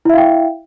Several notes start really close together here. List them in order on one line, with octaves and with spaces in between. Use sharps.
E4 E5 F5 G5